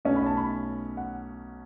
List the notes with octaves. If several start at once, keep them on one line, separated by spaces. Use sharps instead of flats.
B1 B2 A3 C#4
B5
A5
B5
F#5